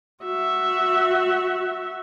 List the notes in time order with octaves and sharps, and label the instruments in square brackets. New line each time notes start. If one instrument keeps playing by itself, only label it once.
[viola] F#4 E5